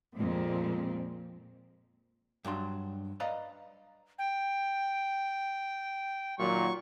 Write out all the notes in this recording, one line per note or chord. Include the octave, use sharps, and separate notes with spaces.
F2 A#2 G#3 C4
G2 F#3 D4 C6
B4 D5 D#5 F5 A#5
G5
A#2 D#3 F#3 C#6